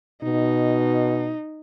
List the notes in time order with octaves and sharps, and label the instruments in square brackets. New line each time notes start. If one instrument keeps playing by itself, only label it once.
[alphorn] B2 [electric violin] D#4